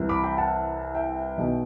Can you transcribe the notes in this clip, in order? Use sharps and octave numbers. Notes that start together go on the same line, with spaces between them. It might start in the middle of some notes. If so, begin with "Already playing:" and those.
Already playing: C2 C3 E3
B5 D6
G5 B5
F#5 A5
E5 G5
B1 B2